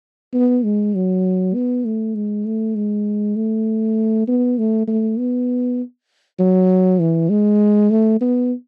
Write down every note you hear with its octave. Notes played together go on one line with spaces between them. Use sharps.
B3
G#3
F#3
B3
A3
G#3
A3
G#3
A3
B3
A3
A3
B3
F#3
E3
G#3
A3
B3